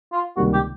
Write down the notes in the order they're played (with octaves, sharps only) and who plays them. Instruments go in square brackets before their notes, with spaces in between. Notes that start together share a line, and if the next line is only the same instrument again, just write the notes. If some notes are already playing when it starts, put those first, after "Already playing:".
[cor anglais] F4
[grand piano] C#2 C3 D#3 G3 A#3 [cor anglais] F#4
[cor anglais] G4